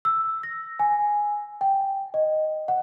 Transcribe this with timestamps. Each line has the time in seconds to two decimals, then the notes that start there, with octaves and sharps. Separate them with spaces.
0.05 E6
0.43 A#6
0.79 G#5
1.61 G5
2.14 D#5
2.68 F#5